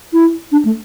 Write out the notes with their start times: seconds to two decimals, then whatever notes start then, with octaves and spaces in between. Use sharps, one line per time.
0.13 E4
0.52 D4
0.65 A3